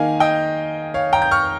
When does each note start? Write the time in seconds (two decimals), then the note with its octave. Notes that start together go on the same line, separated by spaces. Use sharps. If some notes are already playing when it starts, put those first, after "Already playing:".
Already playing: D#3 A#3 D#4 F5 G#5
0.20 D#5 G5
0.94 C#5 F5
1.13 G5 A#5
1.22 G6
1.31 C#6 F6